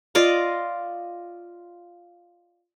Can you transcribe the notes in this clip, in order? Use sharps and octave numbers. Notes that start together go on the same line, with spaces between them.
F4 D5 D#5 F5